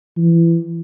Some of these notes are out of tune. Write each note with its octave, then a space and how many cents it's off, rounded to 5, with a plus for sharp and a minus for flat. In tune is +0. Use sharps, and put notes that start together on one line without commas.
E3 +25